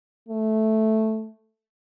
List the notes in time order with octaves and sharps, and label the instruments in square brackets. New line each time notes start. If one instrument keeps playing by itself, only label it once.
[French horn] A3